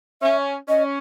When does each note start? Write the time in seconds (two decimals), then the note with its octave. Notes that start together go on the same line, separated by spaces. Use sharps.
0.22 C#4 E5
0.69 C#4 D#5